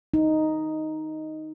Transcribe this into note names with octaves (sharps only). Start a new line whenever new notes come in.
D#4